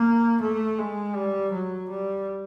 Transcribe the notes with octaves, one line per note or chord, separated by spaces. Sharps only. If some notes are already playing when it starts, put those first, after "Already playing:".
Already playing: A#3
A3
G#3
G3
F#3
G3